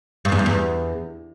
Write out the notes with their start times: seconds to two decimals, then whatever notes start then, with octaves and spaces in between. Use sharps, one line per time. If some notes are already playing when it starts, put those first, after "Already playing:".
0.25 G2
0.32 E2
0.39 G2
0.46 E2